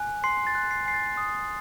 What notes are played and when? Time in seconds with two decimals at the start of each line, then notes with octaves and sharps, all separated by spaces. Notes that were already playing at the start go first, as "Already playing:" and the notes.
Already playing: G#5 F#6
0.24 C6 C7
0.47 A6
0.55 F#6
0.71 C7
0.86 G#5 C7
0.94 A6
1.17 D#6